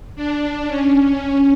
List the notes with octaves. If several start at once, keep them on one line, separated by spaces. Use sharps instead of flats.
D4
C#4